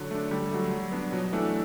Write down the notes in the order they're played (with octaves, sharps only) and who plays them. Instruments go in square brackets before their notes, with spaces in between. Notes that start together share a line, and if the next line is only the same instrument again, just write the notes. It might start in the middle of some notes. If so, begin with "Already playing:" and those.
Already playing: [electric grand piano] D3 [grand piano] F#3
[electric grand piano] A3 D4
[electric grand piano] D3 [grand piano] G3
[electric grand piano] F#3 A3
F#3
B3 D4
[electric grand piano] B2 [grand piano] F#3
[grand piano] E3 [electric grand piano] A3 D4